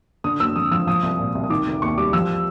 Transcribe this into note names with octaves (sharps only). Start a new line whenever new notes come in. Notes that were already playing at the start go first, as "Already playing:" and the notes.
D3 D#6
F#1 E6
F2 D#6
F3 E6
F3 D#6
C2
A#2
C2
D#6
D#3 D6
F1
D#2 C#6
G3 D6
F3 E6